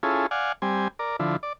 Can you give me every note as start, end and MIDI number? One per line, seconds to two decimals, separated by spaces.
0.03 0.26 61
0.03 0.26 64
0.03 0.26 65
0.03 0.26 68
0.03 0.26 69
0.31 0.52 74
0.31 0.52 77
0.31 0.52 78
0.31 0.52 80
0.62 0.88 55
0.62 0.88 60
0.62 0.88 80
0.99 1.16 70
0.99 1.16 74
1.20 1.36 50
1.20 1.36 53
1.20 1.36 64
1.43 1.53 74